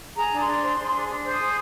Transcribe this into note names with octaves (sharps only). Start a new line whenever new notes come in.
G#4 A#5
D4
C6
D4
C5
G#4
D4
D4
C5
D#6
G#4